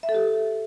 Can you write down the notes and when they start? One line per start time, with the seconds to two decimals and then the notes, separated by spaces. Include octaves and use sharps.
0.03 E5
0.09 A4
0.14 G4